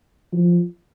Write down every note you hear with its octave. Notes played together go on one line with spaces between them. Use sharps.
F3